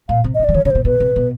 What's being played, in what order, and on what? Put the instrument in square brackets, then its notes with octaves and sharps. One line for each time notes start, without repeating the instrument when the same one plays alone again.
[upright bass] A#2 [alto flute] F5
[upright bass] C3
[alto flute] D#5
[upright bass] C#3
[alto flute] D5
[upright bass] E3
[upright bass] D#3 [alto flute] C#5
[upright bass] C#3 [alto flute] C#5
[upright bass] B2 [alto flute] C5
[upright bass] B2 [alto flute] B4
[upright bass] C3
B2